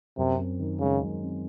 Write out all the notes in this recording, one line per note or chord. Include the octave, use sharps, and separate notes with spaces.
F#2 C3
C4
D#3
C#3 G#3
F#2
C4